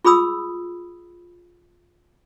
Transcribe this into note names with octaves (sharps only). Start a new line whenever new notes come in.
F4 G#4 B5 D#6 E6